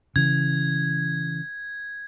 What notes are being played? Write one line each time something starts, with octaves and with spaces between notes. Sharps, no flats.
C#3 E3 G#6